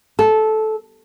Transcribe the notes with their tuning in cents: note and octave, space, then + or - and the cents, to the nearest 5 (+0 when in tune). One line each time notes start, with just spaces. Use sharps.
A4 -15